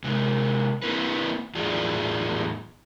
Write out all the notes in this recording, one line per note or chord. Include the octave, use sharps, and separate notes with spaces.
C3 G#3
A#3 C4 E4 B4
E2 A2 F#3 F4 G#4 D5